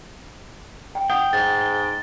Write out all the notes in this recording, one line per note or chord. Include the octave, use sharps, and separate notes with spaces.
G5
F#5 G5 D#6
G#2 A6